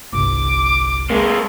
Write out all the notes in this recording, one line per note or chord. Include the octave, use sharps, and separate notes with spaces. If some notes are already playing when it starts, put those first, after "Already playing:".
G1 C2 D6
G#3 A#3